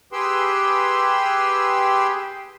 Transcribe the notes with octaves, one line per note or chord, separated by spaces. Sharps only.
G4 G#4 B4 G5 C6 E6